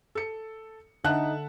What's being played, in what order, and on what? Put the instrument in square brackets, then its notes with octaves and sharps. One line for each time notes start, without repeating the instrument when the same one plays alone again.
[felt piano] A4 C#7
[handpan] D3 [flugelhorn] D#4 [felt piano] E5 F#5 A5 [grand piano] F#6